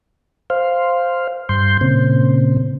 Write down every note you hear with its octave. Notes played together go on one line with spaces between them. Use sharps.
C5 F5
G2 C6 G6
A#2 C#3 C4